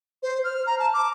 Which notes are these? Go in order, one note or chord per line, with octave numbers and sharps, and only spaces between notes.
C5
F6
A#5
A5
D6